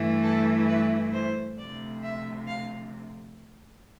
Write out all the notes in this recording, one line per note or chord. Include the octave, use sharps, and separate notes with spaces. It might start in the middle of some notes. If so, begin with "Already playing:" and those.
Already playing: G2 E3 A3 E4
A4
B4
C5
D2 C3 F3 D5
E5
F5